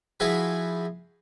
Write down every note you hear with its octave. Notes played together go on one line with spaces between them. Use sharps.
F3 E4 F#4 G#4 B4